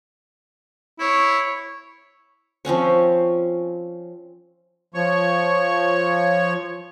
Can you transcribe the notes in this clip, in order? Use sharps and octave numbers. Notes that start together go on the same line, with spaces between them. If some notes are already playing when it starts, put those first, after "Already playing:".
E4 C#5
F3 C4 C#4 C#5
F3 C#5 C#6